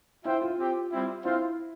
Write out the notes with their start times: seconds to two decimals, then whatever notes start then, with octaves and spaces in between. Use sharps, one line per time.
0.25 E4 F4 C5 E5 G5
0.42 F4
0.59 C4 G4 C5 G5
0.91 G3 C4 E4
1.25 C4 E4 F4 C5 F5